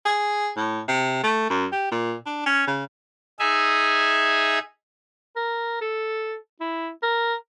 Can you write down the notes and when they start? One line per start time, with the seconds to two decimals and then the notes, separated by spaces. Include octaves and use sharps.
0.05 G#4
0.57 A2
0.88 C3
1.23 A3
1.50 F#2
1.72 G4
1.91 A#2
2.26 D4
2.46 C#4
2.67 C#3
3.39 D#4 G#4 E5 G#5
5.36 A#4
5.81 A4
6.60 E4
7.03 A#4